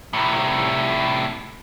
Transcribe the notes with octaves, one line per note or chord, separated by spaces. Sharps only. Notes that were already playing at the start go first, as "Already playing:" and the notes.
C2 A2